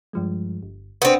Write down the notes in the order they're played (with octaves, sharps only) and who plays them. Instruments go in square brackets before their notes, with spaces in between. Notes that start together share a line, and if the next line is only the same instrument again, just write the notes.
[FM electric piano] G2 F3 G#3
G1
[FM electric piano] A#1 D4 [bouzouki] B3 C4